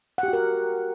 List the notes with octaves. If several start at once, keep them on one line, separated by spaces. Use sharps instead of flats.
F#5
G4
F#4
A#4